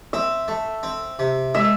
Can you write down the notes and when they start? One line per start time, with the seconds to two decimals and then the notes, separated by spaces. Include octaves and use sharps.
0.13 C4 E5
0.48 A3
0.83 C4
1.19 C3
1.54 G#3 E5